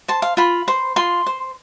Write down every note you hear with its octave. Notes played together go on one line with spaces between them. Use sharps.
C5 A5
F5
F4 B5
C5
F4 C6
C5